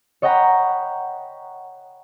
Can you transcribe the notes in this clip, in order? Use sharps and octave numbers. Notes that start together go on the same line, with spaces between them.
C#5 D#5 F#5 G5 A#5 B5